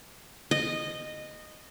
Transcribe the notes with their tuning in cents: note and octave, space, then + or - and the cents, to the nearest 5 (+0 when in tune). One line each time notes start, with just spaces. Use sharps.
D#5 -15